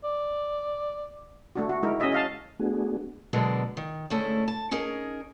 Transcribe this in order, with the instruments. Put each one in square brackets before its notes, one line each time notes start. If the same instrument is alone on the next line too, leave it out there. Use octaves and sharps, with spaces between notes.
[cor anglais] D5
[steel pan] A3 D4 F#4
F#4
G#3 D#4 E4 A#4
C#4 F#4 G#4 D#5 E5
D#5 F5 A5
[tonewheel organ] A3 B3 D4 F#4 G#4
[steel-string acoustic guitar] B2 D3 F#3 G#3 B3 A#4
D#3
D2 G#2 A3 C#4 E4 G#4
A5
C#4 D#4 G#4 A#4